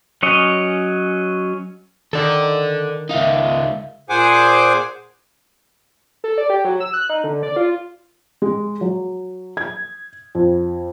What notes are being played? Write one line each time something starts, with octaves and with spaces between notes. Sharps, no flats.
F#3 C#4 C#5 D#5
D#3 A4 D5
C#2 D#4 E5 F5
A#2 G#4 C5 F#5 G#5 D6
A4
D5
G4
F#3
E6
F#6
D#4
D3
D5
F4
G#3
F#3
G#6
F2